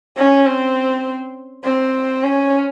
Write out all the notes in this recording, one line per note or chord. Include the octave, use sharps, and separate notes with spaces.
C#4
C4
C4
C#4